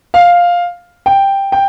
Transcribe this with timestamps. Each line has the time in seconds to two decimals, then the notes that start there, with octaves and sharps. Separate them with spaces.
0.14 F5
1.06 G5
1.52 G5